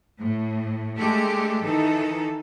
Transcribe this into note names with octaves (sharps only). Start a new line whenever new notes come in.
A2
G#3 A3 D4 G4 A4
D#3 E3 D#4 A4